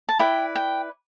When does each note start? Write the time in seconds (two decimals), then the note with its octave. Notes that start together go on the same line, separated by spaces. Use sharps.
0.09 A5
0.19 E4 B4 D5 G5
0.55 G5